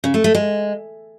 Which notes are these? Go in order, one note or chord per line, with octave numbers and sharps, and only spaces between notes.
C#3
A3
A3
G#3